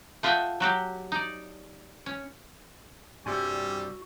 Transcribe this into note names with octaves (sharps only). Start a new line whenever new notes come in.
A3 F4 D#5 E5 F#5 G5
F#3 F#4 G4
D#4 D5
C#4
G2 C3 G3 F#4 G#5 C6 E6